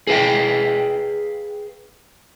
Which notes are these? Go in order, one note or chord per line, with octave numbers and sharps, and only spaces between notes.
G#4 B4 F5 G5